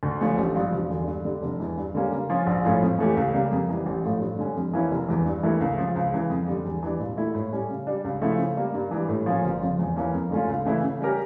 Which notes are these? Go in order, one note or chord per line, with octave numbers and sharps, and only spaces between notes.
D2
D3 F3 A3 C#4
A1
G2 F3
E1
E2 D3
G2
D3 G3
F1
E2 E3
G2
D3 G3 A#3 C#4
C#3
F3 C#4 F4
A#1
A2 F3 C#4 F4
F2
E3 A3 C#4 G4
C#2
C#3 G3 A#3
F2
E3 G3
A1
A2 F3 A3
G2
D3 G3 C#4
F2
E3 A#3 C#4 E4
F1
E2 E3
G2
E3 A3 E4 A#4
C#2
C#3 F3
C#2
C#3 E3
F2
D3 G3
E2
E3 G3 D4
A#2
A3 E4
A2
G3 C#4
C#3
G3 D4
C#2
C#3 F3 A3 E4
C#3
G3 A#3
G2
E3 G3
A2
F3 A#3 C#4
G1
F2 C#3 F3
E2
E3 A#3 C#4
F2
D3 A3 C#4 F4
C#2
C#3 E3 A3 E4
C#3
G3 C#4 G4 A#4